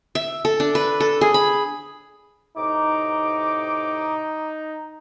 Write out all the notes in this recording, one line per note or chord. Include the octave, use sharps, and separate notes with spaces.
E5
A4
D4
B4
A4
G#4
B5
A2 C3 D#4 D6